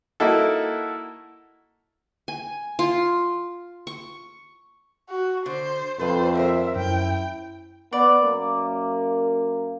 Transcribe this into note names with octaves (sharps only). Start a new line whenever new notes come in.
A#3 D#4 E4 F#4 A4
G#5
F4
C#6
F#4
D3 C5
F2 A4 B4 C5
D#2 A#4 C5 E5
F#2 E4 G5
B3 D5
F#2 A#3